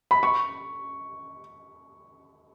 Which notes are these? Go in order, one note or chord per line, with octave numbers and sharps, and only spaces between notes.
B5
C#6